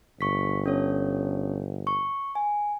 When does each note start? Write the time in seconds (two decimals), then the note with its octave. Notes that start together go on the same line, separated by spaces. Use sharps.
0.21 G1 C#6 B6
0.66 C#4 A4 C#5
1.87 C#6
2.35 G#5